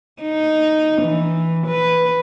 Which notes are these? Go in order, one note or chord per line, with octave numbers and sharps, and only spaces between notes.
D#4
E3
B4